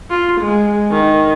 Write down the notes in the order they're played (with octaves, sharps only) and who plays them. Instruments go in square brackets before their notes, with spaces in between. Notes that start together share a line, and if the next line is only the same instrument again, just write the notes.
[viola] F4
G#3
D#3